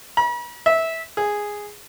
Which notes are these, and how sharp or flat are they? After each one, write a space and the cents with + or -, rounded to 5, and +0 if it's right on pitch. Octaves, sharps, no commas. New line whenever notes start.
B5 -45
E5 -15
G#4 -5